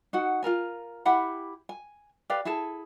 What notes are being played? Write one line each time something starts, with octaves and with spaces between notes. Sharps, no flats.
D#4 F#4 F#5
F4 A4 A#4 G#5
E4 G4 F#5 B5
G#5
G4 B4 D5 F5
E4 G#4 A4 A5